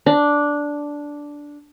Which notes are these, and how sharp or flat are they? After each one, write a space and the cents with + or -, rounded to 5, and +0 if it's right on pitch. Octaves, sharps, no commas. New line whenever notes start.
D4 -5